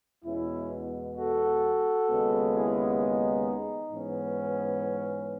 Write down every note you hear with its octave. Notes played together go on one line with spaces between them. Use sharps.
E2 B2 G#3 B3 C#4 E4
F#4 A4
D#2 C#3 G#3 B3
E4 G#4
D#4
G#2 E3 B3 C#4